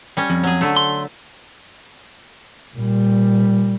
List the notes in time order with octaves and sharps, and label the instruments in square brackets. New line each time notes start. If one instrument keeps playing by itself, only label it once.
[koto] G3 C#4
[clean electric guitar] F2
[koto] F#3 G#4
D3 A3
[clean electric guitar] C6
[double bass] A#2 G3